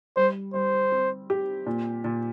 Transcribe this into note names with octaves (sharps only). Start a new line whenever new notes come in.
G3 C5
G3 C5
C4
G4
A#2
A#2